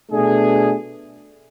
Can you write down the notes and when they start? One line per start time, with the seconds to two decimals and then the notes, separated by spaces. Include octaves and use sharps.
0.11 B2 A3 D4 G#4